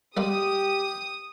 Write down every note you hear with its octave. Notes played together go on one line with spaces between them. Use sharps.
G3 G#3 A#3 G4 D#6